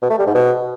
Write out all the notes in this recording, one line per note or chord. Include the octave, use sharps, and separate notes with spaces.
B2
A3
G3
G#2
B2